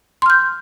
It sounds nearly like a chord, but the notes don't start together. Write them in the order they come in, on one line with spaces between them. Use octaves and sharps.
C6 F6 G6